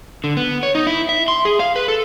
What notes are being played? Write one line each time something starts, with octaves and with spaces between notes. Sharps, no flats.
D3
B3
C#5
D#4
E4
E5
C6
G#4
F5
B4
A4